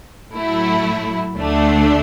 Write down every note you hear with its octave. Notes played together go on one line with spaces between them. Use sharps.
A2 F#3 A3 E4
D2 D3 A3 D4